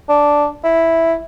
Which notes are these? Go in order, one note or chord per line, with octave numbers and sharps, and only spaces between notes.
D4
E4